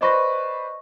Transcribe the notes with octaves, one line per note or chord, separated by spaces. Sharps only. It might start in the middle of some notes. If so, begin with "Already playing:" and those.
B4 C5 D5 D#5 C#6 A#6